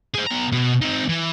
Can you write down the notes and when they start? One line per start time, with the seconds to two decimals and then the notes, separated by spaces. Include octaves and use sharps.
0.14 G#4 C5
0.26 B2 A#5
0.52 B2
0.82 C4 D#4
1.09 E3